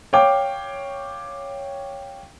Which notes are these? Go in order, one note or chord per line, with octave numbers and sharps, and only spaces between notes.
C#5 F5 G5 D6